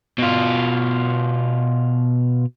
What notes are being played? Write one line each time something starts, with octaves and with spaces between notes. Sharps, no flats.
B2 F4